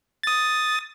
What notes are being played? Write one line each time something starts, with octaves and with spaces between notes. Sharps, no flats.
D#6 A6